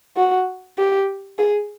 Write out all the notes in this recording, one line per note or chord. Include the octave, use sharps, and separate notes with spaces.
F#4
G4
G#4